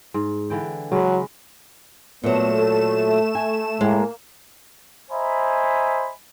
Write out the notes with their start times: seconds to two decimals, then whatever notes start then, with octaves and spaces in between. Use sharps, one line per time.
0.14 G#2
0.50 D3 E3 G5
0.92 C#3 F#3 G#3 B4
2.24 A#2 F#3 A3 B3 E7
2.60 A4
3.35 G#5
3.81 A2 G#3 A#3
5.11 C5 D#5 E5 G#5 A#5 B5